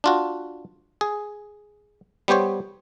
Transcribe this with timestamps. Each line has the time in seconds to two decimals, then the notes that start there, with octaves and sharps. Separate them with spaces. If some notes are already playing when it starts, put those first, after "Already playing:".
0.04 D4 F4 F#4
1.01 G#4
2.28 G3 B3 G4 C5 C#5